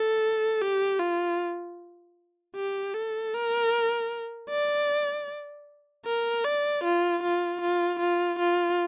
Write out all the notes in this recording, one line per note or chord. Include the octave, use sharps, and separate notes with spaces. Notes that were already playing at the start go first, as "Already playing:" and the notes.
Already playing: A4
G4
F4
G4
A4
A#4
D5
A#4
D5
F4
F4
F4
F4
F4